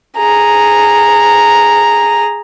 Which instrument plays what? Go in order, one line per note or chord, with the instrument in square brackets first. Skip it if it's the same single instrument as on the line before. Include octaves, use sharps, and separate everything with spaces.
[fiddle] G#4 A#5